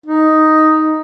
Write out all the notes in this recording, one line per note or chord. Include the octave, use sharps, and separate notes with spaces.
D#4